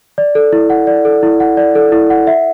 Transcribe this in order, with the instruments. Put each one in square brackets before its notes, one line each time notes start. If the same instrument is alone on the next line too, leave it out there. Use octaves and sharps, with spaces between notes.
[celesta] D5
A4
E4
F#5
D5
A4
E4
F#5
D5
A4
E4
F#5
E5